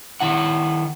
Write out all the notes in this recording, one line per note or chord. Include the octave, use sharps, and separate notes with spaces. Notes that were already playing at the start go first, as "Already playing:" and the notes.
D#3 E4 F#5